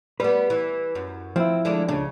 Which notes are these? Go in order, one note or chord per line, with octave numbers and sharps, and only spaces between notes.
G3 B3 B4
E3
F#2
F3 C4 E4
D3 G#3 D4
C#2 C#3 D4